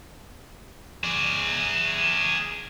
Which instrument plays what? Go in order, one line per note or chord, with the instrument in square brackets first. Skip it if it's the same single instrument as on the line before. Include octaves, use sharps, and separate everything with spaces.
[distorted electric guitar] G#4 D5